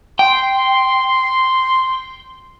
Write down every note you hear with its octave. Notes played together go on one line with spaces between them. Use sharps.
G5 C6